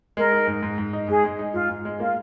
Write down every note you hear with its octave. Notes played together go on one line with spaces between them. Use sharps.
G#3 A#4
D#4
G#2
G#2
G#2
D#4
G#2 G#4
G#3
D#4
G#2 F4
G#2
G#3
A#3 F4